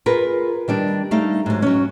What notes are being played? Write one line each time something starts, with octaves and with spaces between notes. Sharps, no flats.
F4 G#4 A#4 B4
D#3 G3 D4
G3 A3 D#4 F5
G#2 F#3
F#3 C#4